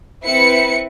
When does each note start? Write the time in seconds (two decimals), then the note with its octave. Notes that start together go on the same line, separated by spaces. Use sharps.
0.25 C4 E4 B4 C#7